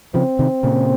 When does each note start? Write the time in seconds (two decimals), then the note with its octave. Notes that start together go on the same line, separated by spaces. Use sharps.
0.14 C#3 F3 C4
0.39 C3 D#3
0.63 A#2 C#3